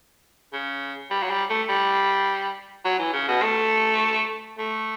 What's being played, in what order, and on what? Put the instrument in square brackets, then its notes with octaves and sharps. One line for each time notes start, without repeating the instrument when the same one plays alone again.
[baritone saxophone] C#3
G3
F#3
G3
A3
G3
F#3
E3
C#3
B2
A3
A3